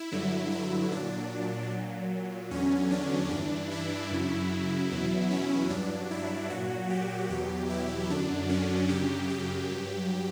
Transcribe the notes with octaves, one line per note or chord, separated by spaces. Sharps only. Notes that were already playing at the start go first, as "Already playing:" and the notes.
Already playing: E4
G2 D3 F#3
E4
A#2 F#3 D4
A#2 F#3
E2 D3 F#3 C#4
D4
G2 E3 D4
E4
F#2 C#3 F#3
E2 B2 F#3
C#4
G2 F#3 D4
E4
A#2 F#3 F#4
G4
E2 B2 F#3 G4
E4
F#2 D3 F#3 D4
C#4
F#2 C#3 F#3 G4
G4
G2 F#3